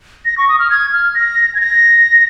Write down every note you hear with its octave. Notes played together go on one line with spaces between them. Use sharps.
A#6
C#6
D#6
F6
G#6
F6
A#6
G#6
A#6